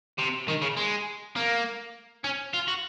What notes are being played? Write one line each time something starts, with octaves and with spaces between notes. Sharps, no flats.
C3
D#3
C#3
G#3
A#3
C#4
F4
F#4